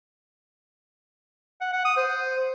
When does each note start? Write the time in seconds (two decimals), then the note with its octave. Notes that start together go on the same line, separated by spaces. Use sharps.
1.61 F#5
1.73 F#5
1.85 D#6
1.97 C5